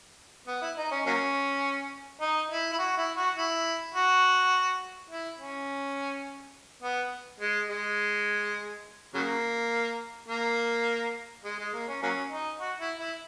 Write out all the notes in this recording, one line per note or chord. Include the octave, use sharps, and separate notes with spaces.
B3
E4
D#4
C#4
F#3 A#3 C#4
D#4
E4
E4
F#4
E4
F#4
E4
F#4
E4
C#4
B3
G#3
G#3
C#3 F#3 A#3
A#3
G#3
G#3
A#3
C#4
F#3 A#3 C#4
D#4
F#4
E4
E4